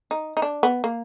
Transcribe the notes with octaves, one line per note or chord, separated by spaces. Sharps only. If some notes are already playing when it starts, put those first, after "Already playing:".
D#4
D#4
D4
B3
A#3